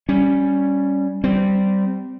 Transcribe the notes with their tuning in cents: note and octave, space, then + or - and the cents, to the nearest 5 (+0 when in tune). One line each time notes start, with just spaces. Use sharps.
G3 +0 C#4 +0
G3 -15 C4 -20